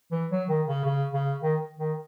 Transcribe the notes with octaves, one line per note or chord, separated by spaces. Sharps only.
E3
F#3
D#3
C#3
C#3
C#3
D#3
D#3